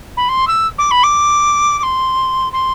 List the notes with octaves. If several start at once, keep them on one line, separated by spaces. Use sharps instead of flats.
B5
C6
E6
D6
B5
D6
D6
C6
C6